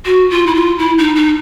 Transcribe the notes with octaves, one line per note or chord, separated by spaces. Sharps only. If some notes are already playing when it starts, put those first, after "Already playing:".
F#4
F4
E4
F4
E4
D#4
D#4